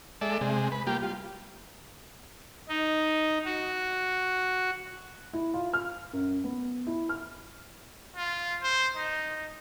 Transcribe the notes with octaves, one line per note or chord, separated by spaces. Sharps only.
G#3 A4 D5 E5
C3 G#3
B4
G3 A#3 F4 G4
F4
D#4
F#4
E4
F4
F6
F#2
B3
E4
F6
F4
C5
D#4